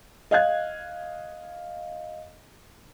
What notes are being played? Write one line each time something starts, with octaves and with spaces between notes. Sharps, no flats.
D#5 F5 F#6 G#6